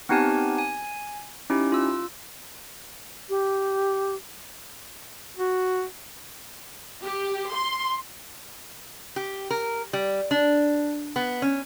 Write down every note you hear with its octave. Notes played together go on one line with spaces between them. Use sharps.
B3 C4 D#4 G4 G#5 A5
G#5
C#4 D#4 E4 G4
F4 E6
G4
F#4
G4
C6
G4
A#4
G3
D4
B3
C#4